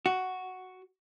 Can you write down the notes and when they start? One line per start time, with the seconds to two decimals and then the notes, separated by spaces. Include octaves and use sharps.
0.06 F#4